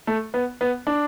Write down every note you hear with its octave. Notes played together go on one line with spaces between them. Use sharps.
A3
B3
B3
D4